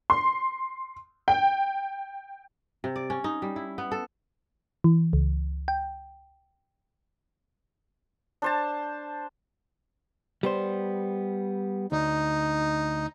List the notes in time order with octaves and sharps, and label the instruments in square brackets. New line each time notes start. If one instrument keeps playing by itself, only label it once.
[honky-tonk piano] C6
G5
[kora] C3
D5
C#4
D#4
G3
E4
B3
A4
[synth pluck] E3
C#2
G5
[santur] D4 C5 A5
[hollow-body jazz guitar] G3 B3 C5
[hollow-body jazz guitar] D2 [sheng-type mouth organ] D#4